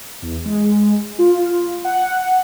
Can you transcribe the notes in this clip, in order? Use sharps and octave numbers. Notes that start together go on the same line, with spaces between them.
E2
G#3
F4
F#5